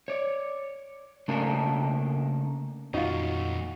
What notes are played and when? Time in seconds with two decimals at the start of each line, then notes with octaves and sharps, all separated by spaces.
0.08 C#5 D5
1.28 C#3 A3 A#3 D4 A4 A#4
2.94 F2 A#2 D#3 G#3 D#4 F4 F#4